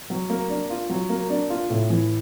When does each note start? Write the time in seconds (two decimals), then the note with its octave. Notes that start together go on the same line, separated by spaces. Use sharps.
0.10 F#3
0.30 A#3
0.50 D4
0.70 F4
0.90 F#3
1.09 A#3
1.30 D4
1.50 F4
1.70 A2
1.90 E3